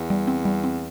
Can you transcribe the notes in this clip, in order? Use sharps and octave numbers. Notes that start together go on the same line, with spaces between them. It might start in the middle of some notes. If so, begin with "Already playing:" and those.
Already playing: E2
G3
C4
G3
C4